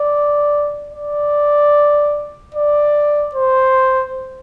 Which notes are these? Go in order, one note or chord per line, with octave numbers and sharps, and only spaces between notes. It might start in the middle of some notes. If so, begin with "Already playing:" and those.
Already playing: D5
D5
D5
C5